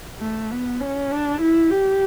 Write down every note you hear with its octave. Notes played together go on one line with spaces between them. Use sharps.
A3
B3
C#4
D4
E4
G4